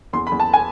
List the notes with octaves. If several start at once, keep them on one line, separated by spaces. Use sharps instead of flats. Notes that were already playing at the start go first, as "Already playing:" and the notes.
E2 C6
B5
E2
A5
G#5